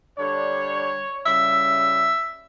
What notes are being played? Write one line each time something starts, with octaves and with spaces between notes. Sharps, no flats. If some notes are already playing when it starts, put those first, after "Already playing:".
D3 G3 D4 C#5
C#3 G3 C#4 E4 E5